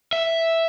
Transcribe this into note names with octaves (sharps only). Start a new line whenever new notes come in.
E5